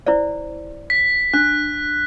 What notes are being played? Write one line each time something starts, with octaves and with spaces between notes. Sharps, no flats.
E4 C5 D5
B6
D4 F#6